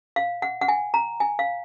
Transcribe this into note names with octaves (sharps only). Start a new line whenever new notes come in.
F5
F#5
F#5
G#5
A#5
G#5
F5